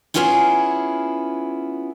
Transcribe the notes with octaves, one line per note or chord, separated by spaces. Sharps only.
B3 C#4 E4 F4 G4 G#4